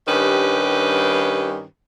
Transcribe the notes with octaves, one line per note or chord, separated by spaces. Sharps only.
G2 D#3 C#4 G4 B4